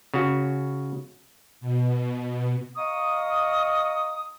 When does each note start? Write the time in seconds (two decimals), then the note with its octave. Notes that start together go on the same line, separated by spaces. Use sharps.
0.14 C#3 F#4
1.61 B2
2.76 D#5 F5 A#5 C#6 D#6